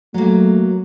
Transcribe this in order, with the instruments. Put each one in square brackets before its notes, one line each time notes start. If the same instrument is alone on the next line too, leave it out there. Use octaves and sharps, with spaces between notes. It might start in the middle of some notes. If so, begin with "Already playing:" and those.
[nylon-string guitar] F#3 A#3 [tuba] A3